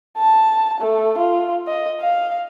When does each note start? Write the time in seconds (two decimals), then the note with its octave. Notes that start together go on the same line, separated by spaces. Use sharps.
0.18 A5
0.80 A3
1.18 F4
1.67 D#5
2.01 F5